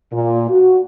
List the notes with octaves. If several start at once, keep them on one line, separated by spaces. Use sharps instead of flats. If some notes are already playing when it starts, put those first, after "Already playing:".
A#2
F#4